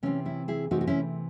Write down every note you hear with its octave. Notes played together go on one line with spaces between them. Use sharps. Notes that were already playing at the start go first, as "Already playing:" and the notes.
C3 E3 A3 C4 C#4
C#4 E4
E4 G#4
C3 E3 A3 C4 D#4 F#4
F#4
C#4 E4